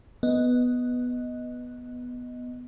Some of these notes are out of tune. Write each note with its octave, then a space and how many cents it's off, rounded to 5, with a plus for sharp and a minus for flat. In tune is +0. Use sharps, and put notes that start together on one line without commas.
B3 +0 D#5 +0